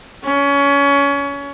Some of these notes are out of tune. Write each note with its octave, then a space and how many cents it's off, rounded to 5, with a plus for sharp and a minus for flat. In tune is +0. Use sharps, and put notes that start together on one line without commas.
C#4 +25